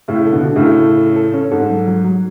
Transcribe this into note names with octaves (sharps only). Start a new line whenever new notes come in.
A2 C#3 C#4
A4
B2 D3
F#4
A2 C#3
A4
C#4
A4
A4
C#4
G#2 A4
F#3
F#3
F#3